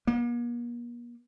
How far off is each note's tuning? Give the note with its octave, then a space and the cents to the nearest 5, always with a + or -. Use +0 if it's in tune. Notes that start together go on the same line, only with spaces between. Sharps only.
A#3 +45